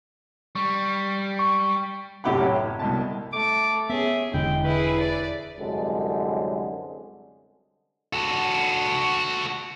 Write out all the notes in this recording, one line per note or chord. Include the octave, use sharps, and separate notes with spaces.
G3 C#6
C#6
F#2 A2 C3 G4 F#5 B5
A1 C#5
C2 B2 A5
A3 D6
B3 C#4 G#4 E5
E1 D3 G#3 E4 G5
E4 G#4 B4
D5
C2 F#2 D3 G#3
F#4 A4